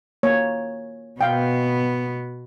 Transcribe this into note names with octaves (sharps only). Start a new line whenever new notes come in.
A#3 C#5
B2 B3 F5 G5